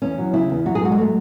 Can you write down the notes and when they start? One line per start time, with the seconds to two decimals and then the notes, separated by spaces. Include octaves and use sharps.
0.02 E2 C#4
0.18 F#3
0.33 C#3 E4
0.50 E2
0.66 F#3 F#4
0.75 G#4
0.81 G#2 F#4
0.92 G#3
0.97 F#3 A3